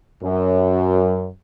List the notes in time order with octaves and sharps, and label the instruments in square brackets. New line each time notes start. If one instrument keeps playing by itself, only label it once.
[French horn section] F#2